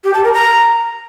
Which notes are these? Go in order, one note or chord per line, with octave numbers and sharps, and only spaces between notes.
G4
A5
A#4
A#5